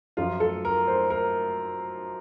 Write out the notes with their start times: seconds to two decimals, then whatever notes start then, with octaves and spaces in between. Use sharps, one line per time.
0.17 F#2 F3 F4
0.40 A4
0.65 A#4
0.87 C5
1.10 A#4